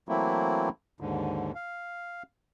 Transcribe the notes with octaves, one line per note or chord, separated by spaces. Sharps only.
E3 F#3 A3 A#3 C4 E4
D#2 G#2 D3
F5